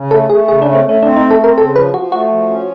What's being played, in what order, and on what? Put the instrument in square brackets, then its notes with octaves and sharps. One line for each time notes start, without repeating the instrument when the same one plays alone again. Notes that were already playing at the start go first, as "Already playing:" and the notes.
Already playing: [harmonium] C#3
[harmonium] A3 [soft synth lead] A4
[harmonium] A3 [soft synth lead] G#4
[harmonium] C#3 [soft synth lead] G#4
[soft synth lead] D4
[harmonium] A3
[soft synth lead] C4
[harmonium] A3 [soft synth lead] C#4
[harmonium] C4 [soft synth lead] D4
[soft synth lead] D#4
[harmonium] A3
[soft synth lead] A4
[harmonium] C4 [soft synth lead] A#4
[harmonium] C#3 [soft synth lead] A4
[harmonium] F3 [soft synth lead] B4
[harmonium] F3 [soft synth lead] F#4
[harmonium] A3 [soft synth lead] F#4
[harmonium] F3
C#4